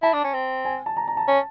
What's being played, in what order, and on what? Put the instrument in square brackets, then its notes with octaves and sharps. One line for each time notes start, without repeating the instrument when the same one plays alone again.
[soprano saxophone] E4 [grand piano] A5
[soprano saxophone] D4
C#4
C4
[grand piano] G#5
A5
A#5
A#5
A5
[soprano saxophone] C#4